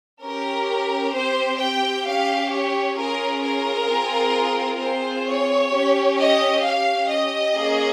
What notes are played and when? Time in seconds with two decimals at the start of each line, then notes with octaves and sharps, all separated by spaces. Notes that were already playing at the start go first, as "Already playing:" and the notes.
0.21 C#4 G4 A#4
1.13 C4 G4 C5
1.60 G5
2.05 C#4 G4 F5
2.51 C#5
2.96 C#4 F4 G#4 A#4
3.42 A#4
3.88 C4 F4 G#4
4.79 C4 F4 G#4 C5
5.26 C#5
5.72 C#4 G4
6.18 D#5
6.63 C#4 G4 F5
7.09 D#5
7.56 A#3 C#4 G#4